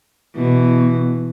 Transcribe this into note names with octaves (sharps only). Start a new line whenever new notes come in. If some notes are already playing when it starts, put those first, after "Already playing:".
B2 E3